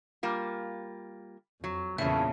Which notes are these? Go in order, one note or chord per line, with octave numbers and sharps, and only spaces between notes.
G3 A#3 F4
F2 F#3
E2 G2 A#2 C#3 E3 A3 C#4 E5